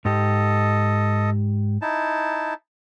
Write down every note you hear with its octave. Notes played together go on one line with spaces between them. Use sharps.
G#2 G4 A4 D#5
D#4 E4 A5